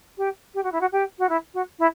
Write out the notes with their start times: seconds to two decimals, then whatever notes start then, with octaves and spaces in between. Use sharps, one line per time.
0.17 G4
0.54 G4
0.63 F#4
0.72 E4
0.81 F#4
0.92 G4
1.18 F#4
1.29 E4
1.54 F#4
1.79 E4